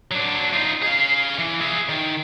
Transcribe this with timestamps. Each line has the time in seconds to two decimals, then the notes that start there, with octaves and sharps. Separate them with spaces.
0.11 F#3 D4
0.53 D#4 F4
0.82 G#4 F5
1.39 E3
1.60 G#4 E5
1.89 D#3